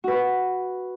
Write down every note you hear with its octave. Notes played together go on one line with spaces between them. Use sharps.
F#4 B4